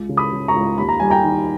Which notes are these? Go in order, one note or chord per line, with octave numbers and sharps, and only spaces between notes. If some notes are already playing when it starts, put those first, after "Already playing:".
Already playing: C#2
C#3
B5 D#6
C#3
A#5 C#6
C#2
D#2 B5
A#5
G3 G#5
G5 A#5
D#3